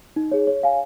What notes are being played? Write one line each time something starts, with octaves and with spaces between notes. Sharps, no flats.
D#4
G#4 C#5
C#5
F5 G#5